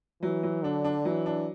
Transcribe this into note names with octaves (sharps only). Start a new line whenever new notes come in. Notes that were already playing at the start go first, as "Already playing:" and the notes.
E3 F#3
F#3
D3 D4
D4
E3 F#3
D4